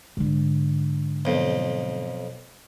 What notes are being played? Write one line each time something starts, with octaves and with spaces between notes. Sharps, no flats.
G#2 D3
B1 F2